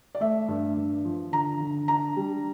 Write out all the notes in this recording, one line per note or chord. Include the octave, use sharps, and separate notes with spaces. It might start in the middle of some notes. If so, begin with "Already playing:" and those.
D5
A3 E5
G2
G2
F3
D3 A#5
D3
D4 A#5
G3